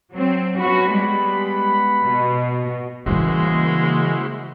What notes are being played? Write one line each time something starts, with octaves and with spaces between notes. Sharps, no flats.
F#3 C4
B3 C#4 F#4 F#5 B5
G3 G#3
B2
C#3 E3 G3 G#3 A#3 E4 F#4 C5